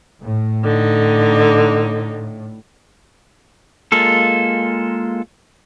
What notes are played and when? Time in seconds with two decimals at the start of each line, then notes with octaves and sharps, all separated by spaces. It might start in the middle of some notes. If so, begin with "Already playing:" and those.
0.22 A2
0.64 D3 D#4
3.92 G#3 A#3 F4 A4